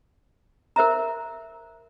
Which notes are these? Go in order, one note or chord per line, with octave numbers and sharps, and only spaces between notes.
A#4 C5 E5 A#5